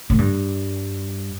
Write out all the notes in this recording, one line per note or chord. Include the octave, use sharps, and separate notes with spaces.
A2
G2